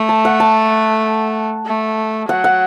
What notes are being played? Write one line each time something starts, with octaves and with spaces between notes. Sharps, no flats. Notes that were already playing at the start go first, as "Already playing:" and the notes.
Already playing: A3
A5
F#5
A5
A3
F#3 F#5
F#5